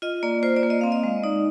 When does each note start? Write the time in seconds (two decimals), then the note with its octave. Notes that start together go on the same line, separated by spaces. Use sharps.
0.02 F4 D#5
0.23 A#3 D5
0.43 F4 C5
0.56 D5
0.63 A#3
0.70 D#5
0.81 C4 F5
0.92 D#5
1.03 G#3
1.23 D#4 D5